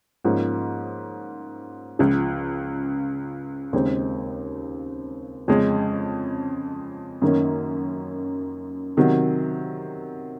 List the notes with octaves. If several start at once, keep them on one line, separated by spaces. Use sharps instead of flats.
G#2 F3 A#3 C#4
C#2 C#3 F3
D#2 C#3 G#3 C4
F2 C#3 G#3 C#4
F#2 D#3 A#3 C#4
C3 D#3 F#3